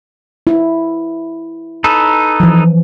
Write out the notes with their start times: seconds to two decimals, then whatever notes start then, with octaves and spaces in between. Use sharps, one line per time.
0.47 E4
1.84 D#4 A4 B4
2.40 E3 F3